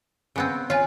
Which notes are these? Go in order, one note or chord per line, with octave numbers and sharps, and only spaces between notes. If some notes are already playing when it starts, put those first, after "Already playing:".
C#3 B3 C4
F4 B4 C#5 G#5